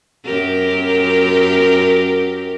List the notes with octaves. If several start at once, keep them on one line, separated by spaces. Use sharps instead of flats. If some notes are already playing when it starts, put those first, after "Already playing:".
F#2 G4 A#4